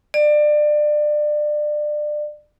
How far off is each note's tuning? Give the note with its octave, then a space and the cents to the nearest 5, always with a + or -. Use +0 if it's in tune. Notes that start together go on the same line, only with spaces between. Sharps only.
D5 +25